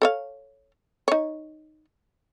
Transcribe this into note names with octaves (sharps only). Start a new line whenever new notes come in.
A4 C#5 F5
D#4 C#5